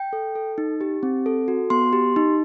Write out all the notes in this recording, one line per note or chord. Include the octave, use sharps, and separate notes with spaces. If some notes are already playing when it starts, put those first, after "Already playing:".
Already playing: G5
A4
A4
D#4
G4
C4
A4
F#4
B3 C6
G4
D#4